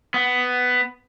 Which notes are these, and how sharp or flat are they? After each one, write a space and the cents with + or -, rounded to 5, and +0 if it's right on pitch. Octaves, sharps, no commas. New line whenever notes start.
B3 +10